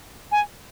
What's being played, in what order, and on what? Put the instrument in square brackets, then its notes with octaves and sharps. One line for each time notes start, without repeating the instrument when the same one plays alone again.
[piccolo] G#5